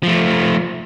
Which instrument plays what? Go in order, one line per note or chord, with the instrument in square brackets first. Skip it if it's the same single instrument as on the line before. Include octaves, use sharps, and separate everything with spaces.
[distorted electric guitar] F3 A3